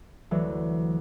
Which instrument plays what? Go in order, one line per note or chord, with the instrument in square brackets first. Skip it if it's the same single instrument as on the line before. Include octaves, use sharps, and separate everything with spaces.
[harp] D2 E3 F#3